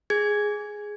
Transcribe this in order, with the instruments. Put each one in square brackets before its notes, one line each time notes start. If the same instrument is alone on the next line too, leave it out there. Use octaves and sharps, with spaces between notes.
[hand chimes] G#4 G#6